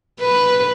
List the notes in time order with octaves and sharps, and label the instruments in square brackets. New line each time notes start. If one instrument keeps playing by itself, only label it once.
[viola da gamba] B4